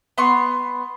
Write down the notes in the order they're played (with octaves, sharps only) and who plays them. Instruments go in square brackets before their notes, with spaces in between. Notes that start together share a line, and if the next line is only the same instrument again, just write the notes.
[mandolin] B3 C6 C#6